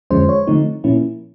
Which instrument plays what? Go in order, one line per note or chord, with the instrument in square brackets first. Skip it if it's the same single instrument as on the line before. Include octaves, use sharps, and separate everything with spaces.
[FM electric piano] F2 D3 F3 G#3 C#4 C5
C#5
D3 F3 A3 C4 D#4
A#2 F3 A#3 C#4 E4